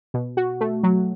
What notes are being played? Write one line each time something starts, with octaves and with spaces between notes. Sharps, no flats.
B2
F#4
A3
F#3